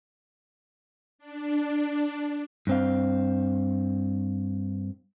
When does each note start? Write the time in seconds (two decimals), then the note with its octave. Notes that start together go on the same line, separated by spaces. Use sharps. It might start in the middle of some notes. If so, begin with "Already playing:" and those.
1.19 D4
2.67 G2 C4 F5